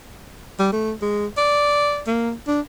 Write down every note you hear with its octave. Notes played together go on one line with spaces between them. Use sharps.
G3
A3
G#3
D5
A#3
D4